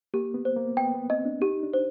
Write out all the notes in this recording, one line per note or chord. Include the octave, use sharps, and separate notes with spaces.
A#3 G4
B3
C5
A#3
B3 G5
B3
C4 D#5
D4
D#4 G4
D4
C5